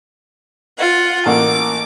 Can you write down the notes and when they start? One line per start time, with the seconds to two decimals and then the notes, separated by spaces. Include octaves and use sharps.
0.78 F4 F#5
1.26 A1 A#3 F#5 D6